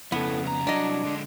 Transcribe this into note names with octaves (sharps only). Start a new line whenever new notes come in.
F2 C#3 B3 E4 A4
C2 A#5
F#3 D4 D#5
D3 G#3